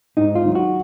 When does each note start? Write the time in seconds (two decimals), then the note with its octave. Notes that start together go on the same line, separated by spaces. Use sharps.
0.17 G#2 D#4
0.36 F4
0.45 D#3 F#3
0.55 F#4